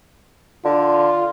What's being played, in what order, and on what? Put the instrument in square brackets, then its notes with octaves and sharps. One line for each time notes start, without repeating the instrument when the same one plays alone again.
[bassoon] D3 [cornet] F4